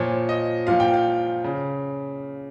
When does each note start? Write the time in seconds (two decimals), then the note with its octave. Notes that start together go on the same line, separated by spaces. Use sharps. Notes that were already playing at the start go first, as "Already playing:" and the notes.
Already playing: A#2 F3 C#5
0.29 D#5
0.67 A#2 F3 F5
0.80 G5
0.94 F5
1.44 C#3